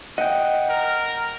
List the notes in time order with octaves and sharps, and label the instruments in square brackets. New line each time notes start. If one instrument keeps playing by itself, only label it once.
[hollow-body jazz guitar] D#5 [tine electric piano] F#5 G5
[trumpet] A#4